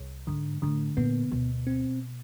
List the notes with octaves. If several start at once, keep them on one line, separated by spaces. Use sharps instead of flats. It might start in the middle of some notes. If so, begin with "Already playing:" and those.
Already playing: C2
G#2 D3
A2 D3
A#2 B3
D2 B2
C4